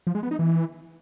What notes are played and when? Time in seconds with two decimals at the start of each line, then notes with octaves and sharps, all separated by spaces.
0.07 F3
0.15 G#3
0.23 B3
0.31 D#4
0.39 E3